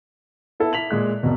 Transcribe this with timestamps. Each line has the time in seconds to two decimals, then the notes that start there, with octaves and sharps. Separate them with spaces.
0.60 B3 E4 A4
0.73 E4 B6 F7 F#7
0.91 A#2 G#3 F#6
1.23 C2 F2 B2